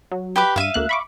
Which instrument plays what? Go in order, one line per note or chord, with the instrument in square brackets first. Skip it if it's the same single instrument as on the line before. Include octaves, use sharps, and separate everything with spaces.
[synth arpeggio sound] F#3
[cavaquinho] G4 B4 D6
[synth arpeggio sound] G2 D#7 [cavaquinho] E5 F5
[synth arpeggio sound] D2 A#3 F#6
B5 C#6 D6